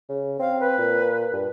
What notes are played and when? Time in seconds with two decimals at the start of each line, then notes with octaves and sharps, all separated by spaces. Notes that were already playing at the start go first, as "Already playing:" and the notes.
0.09 C#3
0.40 C4 F5
0.60 B4
0.78 A#2
1.33 G2